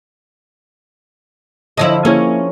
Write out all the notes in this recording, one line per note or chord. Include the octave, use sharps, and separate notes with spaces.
D3 F3 E4 C#5 D#5
A#3 C#4 E4 G#4 A#4 C#5